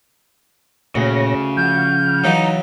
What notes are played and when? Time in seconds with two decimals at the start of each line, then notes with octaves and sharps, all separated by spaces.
0.95 D2 A#2 C#3 C#5 A#6
1.57 F3 F#5 F6 G6
2.24 C#3 E3 F#3 D#4